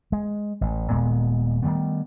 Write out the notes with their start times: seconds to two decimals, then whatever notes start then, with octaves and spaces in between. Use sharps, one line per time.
0.12 G#3
0.61 A1
0.90 D#1 A#2 G#3 B3
1.63 D#3 G3 A3 B3